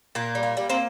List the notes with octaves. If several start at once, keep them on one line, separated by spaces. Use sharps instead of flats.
A#2 A#3
G3
A#3
G3
A#3 C4